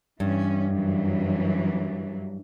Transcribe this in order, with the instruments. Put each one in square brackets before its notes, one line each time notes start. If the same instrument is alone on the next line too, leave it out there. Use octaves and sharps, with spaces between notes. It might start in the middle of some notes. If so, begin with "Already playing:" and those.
[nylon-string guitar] G2 [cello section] E3 C#4
[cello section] F#2 E3 F#3